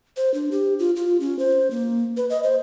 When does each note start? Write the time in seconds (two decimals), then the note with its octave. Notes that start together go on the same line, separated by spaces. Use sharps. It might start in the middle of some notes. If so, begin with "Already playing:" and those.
0.17 C5
0.34 D4
0.51 G4
0.79 F4
0.96 F4
1.20 C#4
1.39 C5
1.71 A#3
2.17 B4
2.30 D#5
2.43 C5